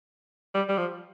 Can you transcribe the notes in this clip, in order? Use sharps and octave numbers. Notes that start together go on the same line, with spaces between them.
G3
G3
F3